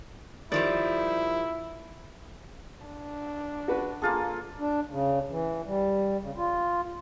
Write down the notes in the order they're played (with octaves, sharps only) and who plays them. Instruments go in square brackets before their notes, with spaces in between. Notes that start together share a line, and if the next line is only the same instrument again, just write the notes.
[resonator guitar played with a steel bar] D#3 F3 G3 [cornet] E4 [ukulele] D5
[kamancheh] D4
[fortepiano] F#4 B4
[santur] A#3 F4 A4 [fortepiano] G#4
[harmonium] D4
C#3
E3
G3
C#3
F4